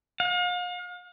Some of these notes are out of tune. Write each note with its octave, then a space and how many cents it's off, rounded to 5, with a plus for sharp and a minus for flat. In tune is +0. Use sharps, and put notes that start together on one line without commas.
F5 +40